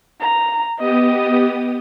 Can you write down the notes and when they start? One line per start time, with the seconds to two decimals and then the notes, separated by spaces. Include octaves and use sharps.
0.21 A#5
0.79 B3 G4 D#5 D#6